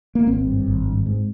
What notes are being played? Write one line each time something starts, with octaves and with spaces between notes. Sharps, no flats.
A#3
G#1 C4
G2
G#1
G2
G#2